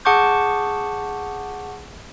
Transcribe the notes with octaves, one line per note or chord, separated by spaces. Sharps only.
G#4 F#5 A5 C#6 D6 G6